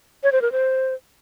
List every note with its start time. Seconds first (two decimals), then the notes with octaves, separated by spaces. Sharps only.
0.23 C#5
0.32 C5
0.42 A#4
0.52 C5